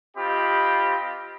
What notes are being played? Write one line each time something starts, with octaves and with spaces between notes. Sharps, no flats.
C4 F4 G4 D#5 B5